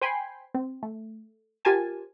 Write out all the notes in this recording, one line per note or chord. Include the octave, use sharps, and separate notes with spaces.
C5 G5 G#5 B5 C6
C4
A3
F4 G4 A#4 C5 G#5 A5